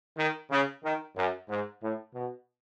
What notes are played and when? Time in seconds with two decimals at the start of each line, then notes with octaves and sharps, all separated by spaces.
0.17 D#3
0.51 C#3
0.83 D#3
1.16 F#2
1.49 G#2
1.82 A2
2.15 B2